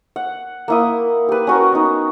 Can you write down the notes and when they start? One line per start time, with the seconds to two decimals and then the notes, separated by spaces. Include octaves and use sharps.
0.16 F#5
0.68 A#3 E4 D#6
1.28 G4 B4
1.47 C#4 F#4 A#4
1.72 B3 D#4